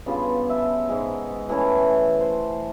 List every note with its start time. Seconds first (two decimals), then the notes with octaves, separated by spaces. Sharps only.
0.06 G2 C#3 B3 F4
0.49 E5
0.89 G#2 G#3
1.49 E3 A3 C#4
2.21 C5